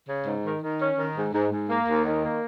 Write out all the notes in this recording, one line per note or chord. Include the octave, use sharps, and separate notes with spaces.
C#3
G#2
D#3
D#3
C#4
D#3
G#2
G#2
G#2
A#3
D#2
D#3
A#3